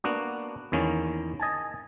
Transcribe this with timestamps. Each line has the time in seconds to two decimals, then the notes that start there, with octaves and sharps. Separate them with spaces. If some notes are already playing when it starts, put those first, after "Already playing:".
0.04 A#3 B3 D4 F#4
0.72 E2 D#3 A#3 C#4
1.40 D#5 G#5 A5